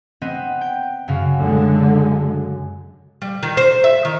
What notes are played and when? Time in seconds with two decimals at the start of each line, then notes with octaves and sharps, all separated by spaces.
0.22 B3 C4 D#5
0.61 G5
1.08 F#2 C#3 F5
1.40 D3 G#3
3.22 G3
3.43 D#3
3.57 C5
3.84 E5
4.05 D#3